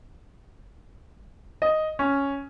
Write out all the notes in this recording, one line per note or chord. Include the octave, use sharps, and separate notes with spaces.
D#5
C#4